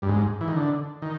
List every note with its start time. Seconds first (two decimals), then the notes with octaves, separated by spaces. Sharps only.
0.02 G2
0.09 G#2
0.41 E3
0.48 D#3
0.56 D3
1.02 D#3